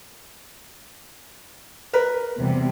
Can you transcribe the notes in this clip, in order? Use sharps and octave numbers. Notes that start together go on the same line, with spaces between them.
A#4 B4
E2 C3 G3